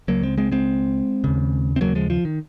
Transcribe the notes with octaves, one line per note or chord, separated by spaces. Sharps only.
C#2 C#3 F#3 A#3
G#3 C4
G#3 C4
G#3 C4
D#2 C#3
C4
F#3 A#3
F3 G#3
F3
D#3